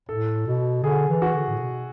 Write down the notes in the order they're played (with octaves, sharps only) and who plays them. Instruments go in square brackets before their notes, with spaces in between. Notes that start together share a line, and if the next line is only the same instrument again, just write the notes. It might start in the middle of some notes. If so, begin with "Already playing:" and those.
[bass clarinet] A2 [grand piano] A4
[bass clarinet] B2
[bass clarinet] D3 [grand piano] G#4
[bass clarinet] E3
[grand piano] F#4
[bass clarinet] D3
A2
B2